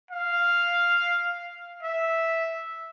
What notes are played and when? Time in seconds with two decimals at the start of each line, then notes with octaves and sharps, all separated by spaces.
0.11 F5
1.83 E5